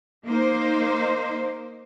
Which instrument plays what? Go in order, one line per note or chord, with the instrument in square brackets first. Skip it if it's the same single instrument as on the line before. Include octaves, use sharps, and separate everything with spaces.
[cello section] A#3 D#4 C5